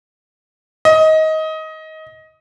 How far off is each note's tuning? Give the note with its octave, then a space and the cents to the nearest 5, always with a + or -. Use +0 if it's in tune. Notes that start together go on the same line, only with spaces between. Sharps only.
D#5 +20